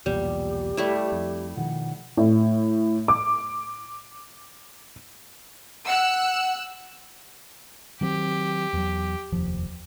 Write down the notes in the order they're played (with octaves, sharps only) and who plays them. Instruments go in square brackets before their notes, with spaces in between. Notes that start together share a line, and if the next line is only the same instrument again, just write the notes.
[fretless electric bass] B1 E2 A#2 [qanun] G3 [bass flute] G4
[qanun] G3 A3 E4
[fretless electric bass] F2
[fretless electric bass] B2 D#3 F3 [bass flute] F#5
[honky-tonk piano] A2
D6
[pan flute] F#5 [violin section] E6 F#6
[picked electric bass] D#3 F#3 C4 [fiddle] G4
[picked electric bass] E2 F#3
F1 D#2 F3